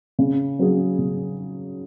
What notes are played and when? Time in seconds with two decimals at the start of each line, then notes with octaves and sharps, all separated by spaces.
0.19 C#3
0.59 F#3 C#4 G#4
0.99 C#3